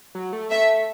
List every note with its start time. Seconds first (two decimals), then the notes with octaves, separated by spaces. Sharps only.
0.15 F#3
0.33 A3
0.50 A3 E5